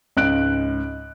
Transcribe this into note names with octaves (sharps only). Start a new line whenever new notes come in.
C#2 G#2 F#6 D7